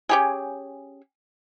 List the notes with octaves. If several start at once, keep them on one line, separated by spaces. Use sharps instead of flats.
C#4 G4 G#4 G#5